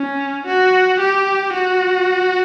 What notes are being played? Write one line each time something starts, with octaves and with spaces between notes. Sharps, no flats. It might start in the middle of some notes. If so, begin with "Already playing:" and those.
Already playing: C#4
F#4
G4
F#4